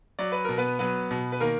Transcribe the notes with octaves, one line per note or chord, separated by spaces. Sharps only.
F#3 D5
B4
B2 A#4
B3 B4
F#3 B3 B4
B2
B4
D#3 A#3 A#4